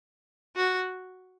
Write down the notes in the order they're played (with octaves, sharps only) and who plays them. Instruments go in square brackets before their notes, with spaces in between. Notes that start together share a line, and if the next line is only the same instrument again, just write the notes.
[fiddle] F#4